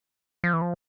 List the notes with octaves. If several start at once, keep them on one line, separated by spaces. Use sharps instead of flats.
F3
E3
F3